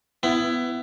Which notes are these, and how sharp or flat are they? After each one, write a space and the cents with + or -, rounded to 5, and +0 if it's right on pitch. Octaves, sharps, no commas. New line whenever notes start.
B3 +20 E4 +20